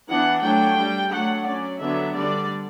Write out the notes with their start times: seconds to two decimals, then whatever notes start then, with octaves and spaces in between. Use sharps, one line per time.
0.08 E3 B3 D4 F#5
0.43 F#3 A3 D4 G5
0.78 G3 D4
1.11 F#3 A3 D4 F#5
1.46 F#3 C#4 D5
1.80 D3 F#3 B3 D4 E5
2.15 D3 G3 D4 D5